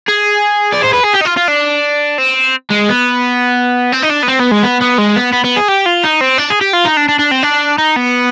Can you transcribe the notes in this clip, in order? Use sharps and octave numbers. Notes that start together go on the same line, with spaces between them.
G#4
D5
C5
B4
G#4
G4
D#4
F4
F4
D4
C4
G#3
B3
C4
D#4
D4
B3
C4
B3
G#3
B3
B3
G#3
B3
B3
B3
G#4
G4
F4
D#4
C4
D4
G#4
G4
F4
D#4
D4
D4
D4
C4
D4
D#4
B3